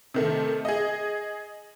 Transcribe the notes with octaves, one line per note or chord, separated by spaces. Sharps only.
C3 D#3 A3
G#4 D#5